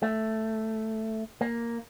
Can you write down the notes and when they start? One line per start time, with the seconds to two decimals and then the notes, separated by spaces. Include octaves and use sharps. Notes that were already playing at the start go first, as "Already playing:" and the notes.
0.03 A3
1.41 A#3